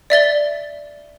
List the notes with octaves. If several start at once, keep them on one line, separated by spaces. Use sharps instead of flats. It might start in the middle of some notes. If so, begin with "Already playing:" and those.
D5 E5 A6 G7